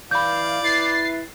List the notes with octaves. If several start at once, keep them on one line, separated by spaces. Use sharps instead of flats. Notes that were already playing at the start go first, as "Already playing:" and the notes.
E3 D5 F5 B5 G6
E4 B4 A6 C7